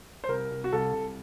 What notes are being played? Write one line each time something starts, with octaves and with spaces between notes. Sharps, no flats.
C5
C2 A#4
C2
F#4
C2 A4
C2